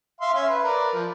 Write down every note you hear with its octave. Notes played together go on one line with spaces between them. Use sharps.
E5 F5 C6
C#4 E5 F5
B4
A#4 B4 D5
F3